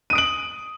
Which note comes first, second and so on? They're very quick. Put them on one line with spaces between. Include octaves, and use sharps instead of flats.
D#7 D#6 D7 F#7